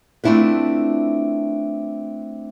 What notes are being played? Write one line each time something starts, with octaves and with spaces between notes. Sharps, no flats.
A3 C4 D4 E4 F4 B4